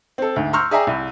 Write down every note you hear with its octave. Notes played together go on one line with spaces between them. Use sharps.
C4 A4
D2 G#2
A#5 C6 C#6 E6 F6 G6
G#4 D5 E5 G5 G#5 A#5
C2